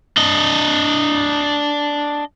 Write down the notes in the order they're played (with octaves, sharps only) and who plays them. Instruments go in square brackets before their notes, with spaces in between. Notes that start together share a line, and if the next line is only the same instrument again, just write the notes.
[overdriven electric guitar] D4 D#5